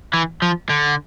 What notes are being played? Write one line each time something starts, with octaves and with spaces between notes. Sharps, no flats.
E3
F3
D3